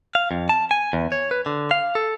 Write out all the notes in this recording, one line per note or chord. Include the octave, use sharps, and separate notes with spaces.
F5
F2
A5
G#5
E2
C#5
B4
D3
F5
A4